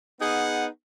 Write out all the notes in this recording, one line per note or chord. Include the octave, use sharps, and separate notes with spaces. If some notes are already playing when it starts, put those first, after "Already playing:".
B3 D#4 G#4 F#5